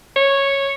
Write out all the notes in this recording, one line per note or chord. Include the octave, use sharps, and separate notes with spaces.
C#5